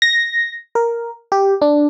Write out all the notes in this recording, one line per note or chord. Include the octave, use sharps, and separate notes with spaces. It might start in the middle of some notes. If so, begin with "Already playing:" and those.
A#6
A#4
G4
D4